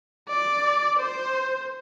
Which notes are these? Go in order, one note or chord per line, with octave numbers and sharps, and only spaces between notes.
D5
C5